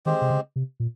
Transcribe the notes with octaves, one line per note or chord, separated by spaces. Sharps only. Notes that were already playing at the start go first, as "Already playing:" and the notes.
D#3 G#3 C4 G4 C5
C3
C#3
C3
A#2